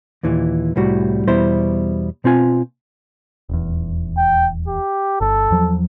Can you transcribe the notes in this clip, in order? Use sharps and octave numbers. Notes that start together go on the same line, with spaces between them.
D#2 A#2 E3
C2 A2 G3 F#4
E2 B2 G3 E4 C5
B2 C4 F4 G#5
D#1 E2
G5
G4
G1 A4
E2 F3 F#3